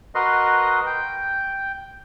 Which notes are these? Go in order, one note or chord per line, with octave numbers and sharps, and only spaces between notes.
F#4 A#4 B4 D#5 C6
G5